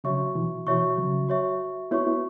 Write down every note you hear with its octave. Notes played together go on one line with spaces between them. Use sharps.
C#3 F#3 F#4 C#5 E5 C#6
B2 E3
B2 E3 F#4 C#5 E5 C#6
C#3 F#3
F#4 C#5 E5 C#6
B3 E4 F#4 C#5 E5 C#6
B3 E4